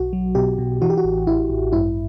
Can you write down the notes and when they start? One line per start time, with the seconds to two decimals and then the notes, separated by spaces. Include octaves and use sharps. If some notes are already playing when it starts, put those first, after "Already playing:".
Already playing: B1 F#4
0.13 F#3
0.35 B2 G4
0.58 B2
0.82 E3 F#4
0.90 G4
0.97 F#4
1.04 A1
1.27 A1 E4
1.50 A1
1.72 G2 E4